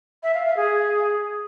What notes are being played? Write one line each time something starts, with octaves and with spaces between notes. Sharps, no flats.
E5
F5
F5
G#4